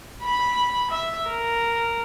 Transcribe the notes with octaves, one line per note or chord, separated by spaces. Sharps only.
B5
E5
A#4